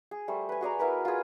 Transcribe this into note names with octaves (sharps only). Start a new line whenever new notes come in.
G#4
G3 A3 C5
B4 G#5
F#4 G#4 D5 A#5
B3 E4 A#4 B4
F4 G#4